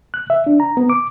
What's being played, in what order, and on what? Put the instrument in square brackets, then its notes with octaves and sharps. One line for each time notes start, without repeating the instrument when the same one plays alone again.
[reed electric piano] F#6
E5
D4
A#5
B3
D6